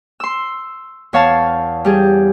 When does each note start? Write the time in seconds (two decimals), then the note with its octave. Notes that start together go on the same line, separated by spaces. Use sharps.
0.20 C6 E6
1.13 E2 C#5 F5 A5
1.85 G3 G4 G#4